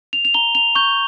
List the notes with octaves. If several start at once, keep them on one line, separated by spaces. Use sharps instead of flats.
F7
F7
A#5 G7
F7
C#6 G6 G7